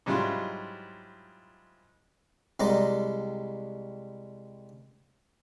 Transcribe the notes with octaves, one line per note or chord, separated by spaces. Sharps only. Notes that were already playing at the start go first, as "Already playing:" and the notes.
G#2 F#3 G3 E4 F4 C6
C2 G3 G#3 D5 A#5 D6